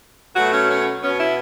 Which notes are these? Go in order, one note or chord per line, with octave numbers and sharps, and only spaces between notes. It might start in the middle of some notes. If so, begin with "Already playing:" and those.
B2 F#3 A3 F#4
C#4
C#4
B2 B3 C#4
E4